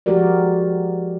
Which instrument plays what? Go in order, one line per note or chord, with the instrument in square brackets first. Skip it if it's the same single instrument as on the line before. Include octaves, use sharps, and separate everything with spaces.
[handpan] F3 G#3 F#4 G4 A#4 D5